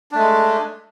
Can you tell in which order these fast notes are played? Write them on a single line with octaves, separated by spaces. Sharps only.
D4 A3 G#3